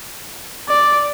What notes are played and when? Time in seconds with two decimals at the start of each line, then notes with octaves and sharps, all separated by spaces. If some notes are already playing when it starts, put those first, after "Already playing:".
0.68 D5